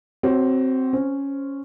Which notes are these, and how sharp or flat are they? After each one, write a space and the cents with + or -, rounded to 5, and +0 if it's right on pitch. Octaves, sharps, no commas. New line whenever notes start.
C4 +0 F#4 +25 C#5 -10
C#4 +0 C5 +5